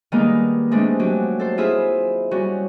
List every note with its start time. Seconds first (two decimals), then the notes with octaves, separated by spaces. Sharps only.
0.12 D#3 G3 G#3 A#3 B3 D#4
0.71 G#3 A3 C4 D4
0.99 F#3 C#4 G4
1.39 A4 C5
1.58 E4 F4 G#4 E5
2.31 G3 C#4 F#4